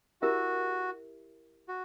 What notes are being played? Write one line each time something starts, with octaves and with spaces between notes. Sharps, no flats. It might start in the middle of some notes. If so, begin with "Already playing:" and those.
E4 F#4 G4 A#4 E5
F#4